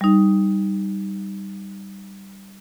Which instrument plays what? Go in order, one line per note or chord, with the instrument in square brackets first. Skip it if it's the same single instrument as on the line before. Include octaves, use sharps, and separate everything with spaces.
[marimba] G3 D#4